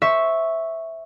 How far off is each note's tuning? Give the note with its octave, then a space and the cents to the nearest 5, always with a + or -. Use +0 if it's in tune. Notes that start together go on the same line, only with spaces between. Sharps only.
C5 +0 E5 -5 C#6 +0